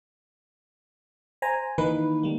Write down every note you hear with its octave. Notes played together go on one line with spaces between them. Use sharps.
C5 G#5 A#5
D#3 E3 A#3 D#4 B4
G3 A#3